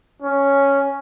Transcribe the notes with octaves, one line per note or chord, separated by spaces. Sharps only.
C#4